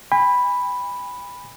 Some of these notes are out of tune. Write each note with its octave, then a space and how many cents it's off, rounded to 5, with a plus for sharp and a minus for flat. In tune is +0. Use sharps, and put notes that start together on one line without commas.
G#5 -45 B5 +0